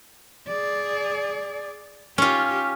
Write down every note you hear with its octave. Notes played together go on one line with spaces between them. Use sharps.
G#4 D5
C#4 F4 G4